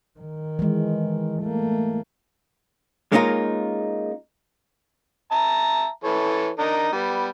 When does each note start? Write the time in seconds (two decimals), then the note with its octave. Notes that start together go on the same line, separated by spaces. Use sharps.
0.19 D#3
0.59 E3 G#3
1.43 A3 A#3
3.12 G#3 A#3 C#4 D#4 F4 A#4
5.31 E5 A5 A#5
6.04 E3 A4 C#5
6.59 D4 D#4 A#4
6.93 G3 B3